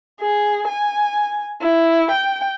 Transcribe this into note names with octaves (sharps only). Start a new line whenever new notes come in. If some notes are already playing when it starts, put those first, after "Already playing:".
G#4
G#5
E4
G5